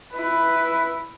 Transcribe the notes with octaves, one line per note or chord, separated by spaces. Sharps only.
E4 B4